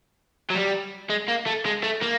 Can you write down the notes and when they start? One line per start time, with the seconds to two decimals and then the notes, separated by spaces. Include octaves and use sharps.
0.50 F#3
0.55 G3
1.10 G#3
1.28 A#3
1.46 A3
1.66 G#3
1.84 A3
2.02 A#3